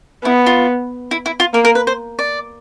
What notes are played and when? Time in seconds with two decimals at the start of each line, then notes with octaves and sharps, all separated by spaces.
0.25 B3 E4
0.46 F4
1.11 E4
1.26 E4
1.40 F4
1.54 A#3 A#4
1.65 A#4
1.75 B4
1.87 C5
2.19 D5